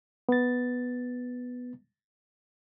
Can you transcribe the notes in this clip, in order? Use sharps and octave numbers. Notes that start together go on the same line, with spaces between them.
B3 A6